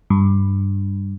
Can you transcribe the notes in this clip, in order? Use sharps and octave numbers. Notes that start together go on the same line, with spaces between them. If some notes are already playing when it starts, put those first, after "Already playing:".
G2